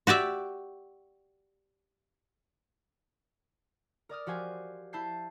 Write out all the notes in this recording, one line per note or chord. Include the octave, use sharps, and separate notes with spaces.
F#4 G4 D5 E5
A#4 D5 D#6 F6
F3 F#4 G4 C5 G#5 G6
E4 A5 G6 C7